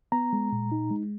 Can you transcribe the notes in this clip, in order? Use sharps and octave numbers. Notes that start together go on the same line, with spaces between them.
B3 A#5
G#3
A#2
D#4
G#3